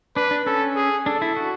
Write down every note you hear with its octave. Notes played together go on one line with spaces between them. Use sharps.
D4 B4
D4
C#4 A4
G#4
D4 A4
E4
F#4